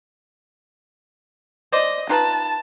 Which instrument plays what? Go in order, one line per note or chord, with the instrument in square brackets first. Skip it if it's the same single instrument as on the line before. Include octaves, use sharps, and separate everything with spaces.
[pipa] C5 D5 [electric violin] D#5
[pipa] D#4 F4 B4 [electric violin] A5